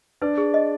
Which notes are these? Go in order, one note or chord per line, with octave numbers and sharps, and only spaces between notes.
D4 B4 D5
G#4
D#5